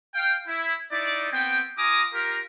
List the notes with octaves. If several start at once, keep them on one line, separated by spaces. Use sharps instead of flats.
F5 G5
E4
D#4 E4 D5
B3 C4 G5
F4 G#5 A#5 D6 D#6
F4 G4 A#4